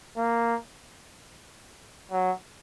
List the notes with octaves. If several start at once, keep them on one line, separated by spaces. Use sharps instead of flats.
A#3
F#3